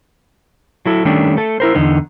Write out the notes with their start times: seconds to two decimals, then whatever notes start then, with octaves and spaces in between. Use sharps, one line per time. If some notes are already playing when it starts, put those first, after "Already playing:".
0.86 F#3 E4 A4
1.05 D#3 G3 A3 C#4 D4
1.37 A3 A4
1.60 E4 A#4 C5
1.75 E2 D3 D#4